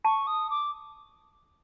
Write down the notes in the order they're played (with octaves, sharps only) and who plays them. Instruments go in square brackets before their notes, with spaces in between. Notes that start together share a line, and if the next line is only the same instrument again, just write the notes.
[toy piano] A5 [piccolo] C#6
[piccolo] D#6
D6